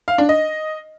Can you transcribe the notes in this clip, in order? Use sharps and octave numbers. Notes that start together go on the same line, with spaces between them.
F5
D4
D#5